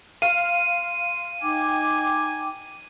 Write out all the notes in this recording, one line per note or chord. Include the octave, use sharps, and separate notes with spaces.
F5 C6 D#7
D#4 G5 G#5 D6